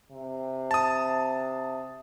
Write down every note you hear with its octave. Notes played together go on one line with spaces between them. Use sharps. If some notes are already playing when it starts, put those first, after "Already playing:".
C3
A5 D#6